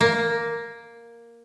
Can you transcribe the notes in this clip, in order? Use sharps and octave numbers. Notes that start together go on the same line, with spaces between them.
A#3